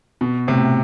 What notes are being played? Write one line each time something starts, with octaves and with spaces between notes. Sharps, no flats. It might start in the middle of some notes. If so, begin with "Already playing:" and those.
B2
A2 C3